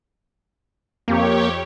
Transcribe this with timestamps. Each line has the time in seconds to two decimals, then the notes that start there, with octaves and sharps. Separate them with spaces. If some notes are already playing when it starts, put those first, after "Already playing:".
1.08 F2 A#3 G4 C#5